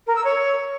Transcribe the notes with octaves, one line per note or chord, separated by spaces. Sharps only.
A#4
E6
C#5